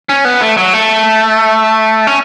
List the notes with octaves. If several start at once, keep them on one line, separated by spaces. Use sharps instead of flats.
C#4
B3
A3
F#3
A3
C#4